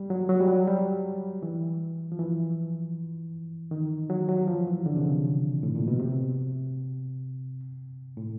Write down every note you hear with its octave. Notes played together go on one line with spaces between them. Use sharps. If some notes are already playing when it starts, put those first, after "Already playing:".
Already playing: G3
F#3
F#3
G3
F#3
G3
E3
F3
E3
D#3
F#3
F#3
F3
E3
D3
C3
C#3
A2
A#2
B2
C3
A2